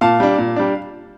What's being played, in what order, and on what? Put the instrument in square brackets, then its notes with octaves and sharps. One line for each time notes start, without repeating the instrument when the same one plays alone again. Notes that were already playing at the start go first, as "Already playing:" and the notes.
[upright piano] A#2 F5 A5
G3 D4
A#2
G3 D4